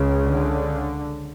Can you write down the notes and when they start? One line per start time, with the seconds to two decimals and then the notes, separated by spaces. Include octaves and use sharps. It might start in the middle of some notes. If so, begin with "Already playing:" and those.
Already playing: C#2 C#3
0.23 D3